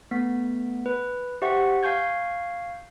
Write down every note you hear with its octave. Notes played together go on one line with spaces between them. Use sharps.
A3 B3 B6
B4
G4 C5 E5 F#5 C#6
F5 G#5 C#6 G6 G#6